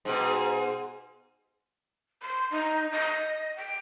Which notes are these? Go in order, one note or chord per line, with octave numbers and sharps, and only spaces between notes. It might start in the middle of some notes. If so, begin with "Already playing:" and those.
G#2 B2
C6
D#4
D#5
G5